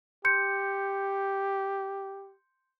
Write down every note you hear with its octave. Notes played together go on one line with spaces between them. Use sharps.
G4 C6 G6 C#7